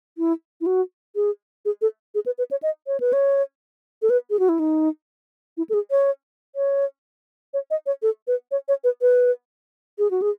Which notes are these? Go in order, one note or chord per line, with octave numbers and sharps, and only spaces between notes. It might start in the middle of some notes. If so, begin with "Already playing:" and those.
E4
E4
F#4
G#4
G#4
A4
G#4
B4
B4
C#5
D#5
C#5
B4
C#5
A4
B4
G#4
F#4
E4
D#4
E4
A4
G#4
C#5
C#5
C#5
D#5
C#5
A4
B4
C#5
C#5
B4
B4
G#4
F#4
G#4